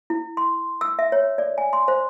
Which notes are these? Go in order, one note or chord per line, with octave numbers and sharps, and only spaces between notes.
E4
C6
E6
E5
C#5
D5
G#5
C6
C5